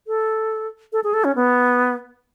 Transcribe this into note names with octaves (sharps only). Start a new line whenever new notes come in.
A4
A4
G#4
A4
C#4
B3